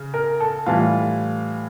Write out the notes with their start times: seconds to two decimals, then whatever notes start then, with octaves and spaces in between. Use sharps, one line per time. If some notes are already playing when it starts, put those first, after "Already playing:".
Already playing: C#3
0.14 A#4
0.40 A4
0.66 A2 E3 G3 F4